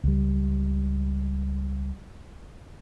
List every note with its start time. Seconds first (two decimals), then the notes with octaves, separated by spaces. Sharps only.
0.04 C#2 G3